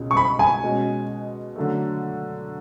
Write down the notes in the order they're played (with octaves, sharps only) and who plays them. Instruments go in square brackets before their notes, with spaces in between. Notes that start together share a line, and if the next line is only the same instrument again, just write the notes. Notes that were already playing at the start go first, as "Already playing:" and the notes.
Already playing: [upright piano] C#2 B2 G#3 C#4 G#4
[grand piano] C#6
B5
G#5
[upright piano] B2 G#3 C#4 F#4
D3 F#3 A3